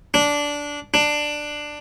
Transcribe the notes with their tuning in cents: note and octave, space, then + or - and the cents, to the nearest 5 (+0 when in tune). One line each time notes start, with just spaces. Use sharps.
D4 -10
D4 +10